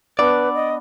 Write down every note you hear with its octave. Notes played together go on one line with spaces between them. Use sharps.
B3 D4 B4 D5 E6
D#5